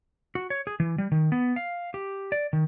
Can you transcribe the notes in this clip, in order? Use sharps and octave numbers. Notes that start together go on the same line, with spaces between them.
F#4
C#5
G#4
E3
G3
D#3
B3
F5
G4
D5
D#3